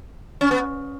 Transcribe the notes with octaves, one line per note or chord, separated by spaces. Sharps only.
C#4
B3